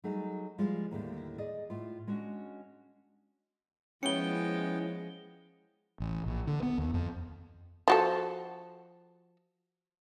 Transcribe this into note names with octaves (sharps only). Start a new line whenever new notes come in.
F#3 G3 A3 D#4 G#4
F3 G3 G#3 F4
D#2 A2 D3 D4 G4
G#4 D5 D#5
A2 F4
G#3 C#4 D4 F#4
F3 G#3 B3 C#4 E4 G5 C#7 G7
A1
A#1
D3
B3
D#2
F2
F3 F#4 A4